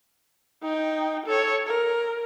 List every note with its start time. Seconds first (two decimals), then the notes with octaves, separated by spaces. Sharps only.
0.62 D#4 G5
1.26 A4 C#5
1.67 A#4